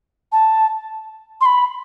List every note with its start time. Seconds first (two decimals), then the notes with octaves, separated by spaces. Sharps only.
0.32 A5
1.41 C6
1.45 B5